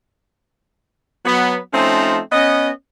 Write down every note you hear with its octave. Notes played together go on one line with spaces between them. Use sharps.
F#3 B3
F3 A3 C4 C#4 D#4
B3 C#4 D#5